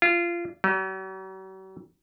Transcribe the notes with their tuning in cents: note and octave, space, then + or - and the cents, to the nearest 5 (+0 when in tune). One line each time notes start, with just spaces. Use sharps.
F4 -25
F#3 +45